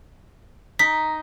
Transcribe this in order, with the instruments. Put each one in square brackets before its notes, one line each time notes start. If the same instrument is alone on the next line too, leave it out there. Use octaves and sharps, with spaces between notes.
[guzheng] D#4 [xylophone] B6